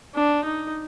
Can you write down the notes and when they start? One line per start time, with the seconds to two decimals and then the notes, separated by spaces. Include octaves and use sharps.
0.15 D4
0.44 D#4